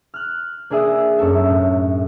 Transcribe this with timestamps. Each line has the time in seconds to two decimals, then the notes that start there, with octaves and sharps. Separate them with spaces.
0.14 F6 F#6
0.70 A#3 D4 G#4 E5 D#6
1.19 F#2 C#4 A4 E5
1.50 A2